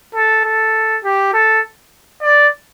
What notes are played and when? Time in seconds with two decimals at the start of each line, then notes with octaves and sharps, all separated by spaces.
0.15 A4
0.45 A4
1.04 G4
1.34 A4
2.22 D5